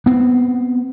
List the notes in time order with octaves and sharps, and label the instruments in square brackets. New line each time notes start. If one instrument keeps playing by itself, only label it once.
[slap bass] B3 C4